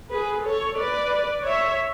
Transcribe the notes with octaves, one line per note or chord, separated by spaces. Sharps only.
G#4 B4
A4 C#5
B4 D5
C#5 E5